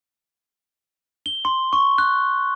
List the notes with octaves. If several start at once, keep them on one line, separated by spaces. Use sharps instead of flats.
G7
C6
C#6
F#6